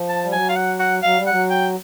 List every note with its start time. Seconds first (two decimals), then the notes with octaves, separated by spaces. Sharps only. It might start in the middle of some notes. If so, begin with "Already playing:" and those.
Already playing: F3
0.09 A5
0.24 G3
0.32 F#3 G#5
0.49 F5
0.56 F#5
0.80 F#5
1.03 F#3 F5
1.17 G3
1.27 F#3 F#5
1.50 G5